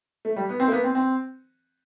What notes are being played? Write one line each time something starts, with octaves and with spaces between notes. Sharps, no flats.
A3
G3
B3
C4
A#3
B3
C4
C4